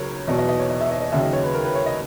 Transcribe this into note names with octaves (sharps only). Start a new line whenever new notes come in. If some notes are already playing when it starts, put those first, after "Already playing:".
Already playing: C#2 C#3 F#3 A#4 C#5
E2 B2 F#3 D#5
D#5
D#5
C#5
D#5
E5
D#5
D#5
D#2 C#3 F#3 E5
D#5
C#5
B4
A#4
B4
C#5
D#5